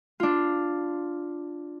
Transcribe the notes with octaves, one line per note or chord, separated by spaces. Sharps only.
D4 F4